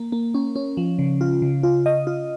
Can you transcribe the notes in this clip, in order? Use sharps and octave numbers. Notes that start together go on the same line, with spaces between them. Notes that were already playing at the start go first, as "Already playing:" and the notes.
Already playing: A#3
A#3
C#4
C#4
F3
C#3
F4
C#3
F4
D#5
F4